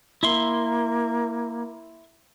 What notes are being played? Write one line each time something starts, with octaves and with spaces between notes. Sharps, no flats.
A#3 E4 E5 C6